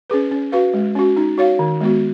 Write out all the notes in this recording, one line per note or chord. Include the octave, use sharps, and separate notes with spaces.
C#4 G#4 B4
C#4
F#4 B4 F5
G#3
C#4 F#4
D#4
F#4 C#5 F5
D#3
G#3 B3 F#4